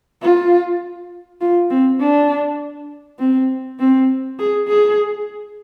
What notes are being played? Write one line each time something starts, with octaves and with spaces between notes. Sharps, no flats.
F4
F4
C4
D4
C4
C4
G#4
G#4